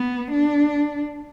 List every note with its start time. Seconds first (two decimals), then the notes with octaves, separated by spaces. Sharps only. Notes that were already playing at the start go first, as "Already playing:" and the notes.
Already playing: B3
0.32 D4